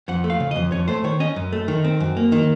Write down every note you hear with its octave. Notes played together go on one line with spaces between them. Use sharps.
F2 F#5
A3
F5
C#3
F2 D#5
F2 C#5
A3 C5
D#3 C#5
C#4 D#5
F#2
A3
D#3
C4
F#2
A#3
D#3